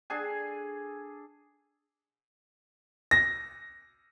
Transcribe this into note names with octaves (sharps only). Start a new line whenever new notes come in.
D4 G#4 A4 G#5
A#6